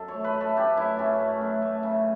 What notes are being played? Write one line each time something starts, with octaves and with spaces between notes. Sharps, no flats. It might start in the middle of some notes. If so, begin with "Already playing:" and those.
Already playing: F#2 A4
C#5
A3
B4
A3
A4
C#4 G4
F#2 E4
F#2 C#4
A3
F#2
A3
C#3